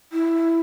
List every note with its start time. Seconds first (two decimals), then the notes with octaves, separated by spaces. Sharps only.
0.12 E4